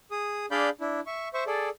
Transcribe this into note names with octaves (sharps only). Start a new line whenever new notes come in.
G#4 D#6
D4 G#4 D5 F5 B5 G6
D4 E4
E5 C#6
C5 E5 C#6
G#4 A4 D5